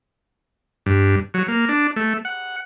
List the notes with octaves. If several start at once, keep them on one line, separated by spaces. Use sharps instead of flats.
G2
F#3
A#3
D4
A3
F#5